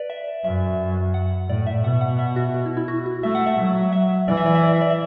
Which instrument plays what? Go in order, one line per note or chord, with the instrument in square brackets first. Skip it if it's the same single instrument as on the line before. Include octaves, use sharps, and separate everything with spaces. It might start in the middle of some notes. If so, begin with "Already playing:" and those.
Already playing: [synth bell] B4 D5
E5
[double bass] F#2 [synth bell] E5
[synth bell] F#5
[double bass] A2 [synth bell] D5
[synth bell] E5
[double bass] B2 [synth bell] F#5
[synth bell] F#5
E5
F#4
F#4
E4
E4
F#4
F#4
[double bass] A3 [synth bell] E5
[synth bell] F#5
E5
[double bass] F#3
[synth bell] E5
[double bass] E3 [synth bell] D5
[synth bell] E5
D5
E5
D5
E5
D5
E5